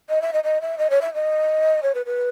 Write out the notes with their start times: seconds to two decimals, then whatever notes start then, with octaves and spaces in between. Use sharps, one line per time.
0.09 D#5
0.22 E5
0.33 D#5
0.44 D#5
0.61 E5
0.78 D#5
0.90 C#5
1.01 E5
1.14 D#5
1.83 C#5
1.95 B4
2.06 B4